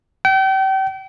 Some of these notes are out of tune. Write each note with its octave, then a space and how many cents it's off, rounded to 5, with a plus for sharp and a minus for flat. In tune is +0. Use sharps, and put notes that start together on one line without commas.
G5 -35